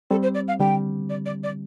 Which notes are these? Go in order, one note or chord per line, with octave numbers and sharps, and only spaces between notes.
G3 C4 A4
C5
D5
F5
D3 G3 G5
D5
D5
D5